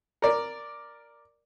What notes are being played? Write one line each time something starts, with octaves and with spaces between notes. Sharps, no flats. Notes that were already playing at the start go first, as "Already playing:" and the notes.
A#4 D5